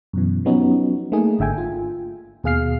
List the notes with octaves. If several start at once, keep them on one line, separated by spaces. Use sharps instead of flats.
F#2 B2 E3
F3 F#3 B3 C#4 D#4 F#4
A3 A#3 D#4 G#4
G#1 D3 E5 G5 G#5
F4
D#2 B2 G#4 F5 F6 C7